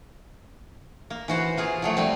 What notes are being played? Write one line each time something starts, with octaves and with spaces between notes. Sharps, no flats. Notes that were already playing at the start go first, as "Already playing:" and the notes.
A#3
E3 F#4 C5
A#3 F4 G#4
F3 F#3 A3
G3 A3 C4